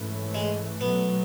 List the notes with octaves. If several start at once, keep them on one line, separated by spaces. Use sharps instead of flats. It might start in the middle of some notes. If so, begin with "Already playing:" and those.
Already playing: G#2 E3 A3 C#4
G#3
B2 F#3 A3 B3